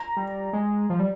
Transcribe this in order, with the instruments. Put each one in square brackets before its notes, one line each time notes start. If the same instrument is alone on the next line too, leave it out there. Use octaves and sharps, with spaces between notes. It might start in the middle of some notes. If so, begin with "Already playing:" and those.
Already playing: [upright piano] A#5
[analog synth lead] G3
G#3
F3
G3